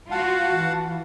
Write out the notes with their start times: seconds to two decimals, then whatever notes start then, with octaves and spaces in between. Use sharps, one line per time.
0.11 F4 F#4 F5 F#5 A5
0.57 E3